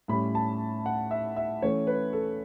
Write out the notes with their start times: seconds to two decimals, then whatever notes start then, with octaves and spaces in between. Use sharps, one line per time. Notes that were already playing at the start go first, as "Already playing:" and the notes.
0.08 A2 G3 C#4 B5
0.35 A5
0.86 F#5
1.11 E5
1.36 E5
1.62 E3 A3 C#4 C#5
1.87 B4
2.13 A4